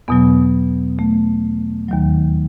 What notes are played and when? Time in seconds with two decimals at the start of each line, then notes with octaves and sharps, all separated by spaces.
0.08 E2 B2 F#3 B3
0.99 A3
1.89 D#2 D#3 F#3